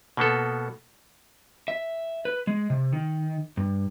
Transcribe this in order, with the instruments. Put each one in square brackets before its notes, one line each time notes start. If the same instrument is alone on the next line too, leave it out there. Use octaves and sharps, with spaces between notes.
[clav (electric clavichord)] B2 A#3 B3 A4
[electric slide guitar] E5
B4
G#3
C3
D#3
G2